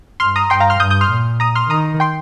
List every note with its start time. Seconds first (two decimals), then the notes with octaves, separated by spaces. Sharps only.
0.20 G2 C6 F6
0.36 A#5 D#6
0.50 G2 G5 C6
0.60 F5 A#5
0.70 C6 F6
0.80 G2 D#6 G6
0.90 D#6 G6
1.01 C6 F6
1.10 A#2
1.40 A#5 D#6
1.55 C6 F6
1.70 D#3 A#5 D#6
2.00 G5 C6